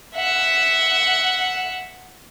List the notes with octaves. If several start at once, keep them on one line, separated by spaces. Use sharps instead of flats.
E5 F#5